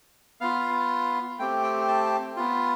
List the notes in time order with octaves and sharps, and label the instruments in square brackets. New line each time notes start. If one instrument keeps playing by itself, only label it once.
[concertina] B3 F4 F5
A3 C4 G4 G5
G5
A5
B3 F4